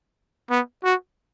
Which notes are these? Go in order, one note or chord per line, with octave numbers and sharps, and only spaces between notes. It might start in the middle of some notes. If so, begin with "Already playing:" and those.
B3
F#4